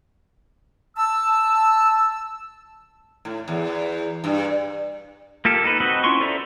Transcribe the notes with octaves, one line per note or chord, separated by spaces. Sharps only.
A5 E6
A2
E2
G2
A#3 F4 G4 A4
D#4 A4 B4
C4 F#4 B4 D#5 F#5
C#4 E4 F4 C6 C#6
A4 C5 D5 E5 A#5